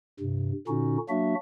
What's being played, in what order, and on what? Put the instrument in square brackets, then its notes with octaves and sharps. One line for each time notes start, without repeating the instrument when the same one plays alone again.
[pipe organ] G2 C3
A#2 D3 C#4 D#4 F#4
F#3 A#3 D4 F#4 E5